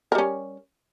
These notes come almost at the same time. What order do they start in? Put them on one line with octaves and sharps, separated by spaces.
A#4 G3 C#4